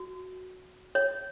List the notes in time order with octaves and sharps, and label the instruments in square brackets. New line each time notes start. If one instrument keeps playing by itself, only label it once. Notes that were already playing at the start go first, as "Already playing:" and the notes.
Already playing: [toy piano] F#4
C#5